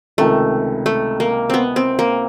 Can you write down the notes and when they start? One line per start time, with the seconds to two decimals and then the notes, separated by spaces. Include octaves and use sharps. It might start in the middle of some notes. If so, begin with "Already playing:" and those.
0.18 C#2 C3 D#3 A3
0.86 A3
1.20 A#3
1.50 B3 C4
1.76 C4
1.99 A#3